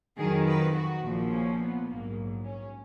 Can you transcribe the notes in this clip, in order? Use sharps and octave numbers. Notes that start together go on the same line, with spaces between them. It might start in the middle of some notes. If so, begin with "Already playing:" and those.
F2 D#3 F#3 G#4
B4
F#4
A#1 A#2 F3
C#4
B3
A#1 G#2 F#3 A#3
C#4